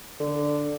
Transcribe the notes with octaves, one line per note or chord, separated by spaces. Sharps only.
D3